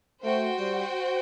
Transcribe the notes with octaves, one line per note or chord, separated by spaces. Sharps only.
A3 F#4 C5 G5
G3